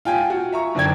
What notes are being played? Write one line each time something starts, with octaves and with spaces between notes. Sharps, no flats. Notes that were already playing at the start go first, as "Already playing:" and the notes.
F4 G5 G#5
F#4
E5 A#5 C#6
F#1 D3 D5 G5 G#6